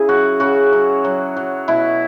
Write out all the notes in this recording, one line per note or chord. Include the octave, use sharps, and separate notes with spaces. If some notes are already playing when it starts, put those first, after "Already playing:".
Already playing: C#3 E4 G#4
F#3 F#4
C#3 F#4
F#3
F#3
F#3
B2 E4